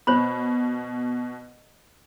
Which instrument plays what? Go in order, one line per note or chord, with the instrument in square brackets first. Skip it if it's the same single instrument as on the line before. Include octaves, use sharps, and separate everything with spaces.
[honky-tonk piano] B2 [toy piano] C5 C#5 B5